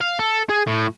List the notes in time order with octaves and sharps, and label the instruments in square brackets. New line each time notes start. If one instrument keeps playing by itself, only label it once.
[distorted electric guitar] F5
A4
G#4
A2